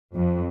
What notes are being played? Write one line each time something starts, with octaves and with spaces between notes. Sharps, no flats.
F2